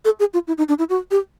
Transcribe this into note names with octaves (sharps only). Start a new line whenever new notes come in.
A4
G#4
F4
E4
D#4
D4
E4
F#4
G4